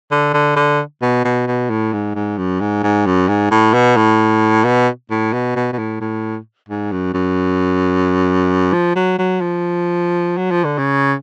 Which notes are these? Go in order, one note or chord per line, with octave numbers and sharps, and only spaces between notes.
D3
D3
D3
B2
B2
B2
A2
G#2
G#2
F#2
G#2
G#2
F#2
G#2
A2
B2
A2
B2
A2
B2
B2
B2
A2
A2
G#2
F#2
F#2
F3
F#3
F#3
F3
F#3
F3
D3
C#3